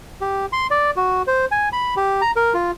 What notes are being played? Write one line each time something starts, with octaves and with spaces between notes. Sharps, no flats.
G4
C6
D5
F#4
C5
G#5
B5
G4
A#5
A#4
F4